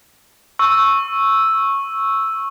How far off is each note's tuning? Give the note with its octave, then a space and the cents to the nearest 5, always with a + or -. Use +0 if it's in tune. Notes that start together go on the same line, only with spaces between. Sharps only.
C#6 -10 E6 +0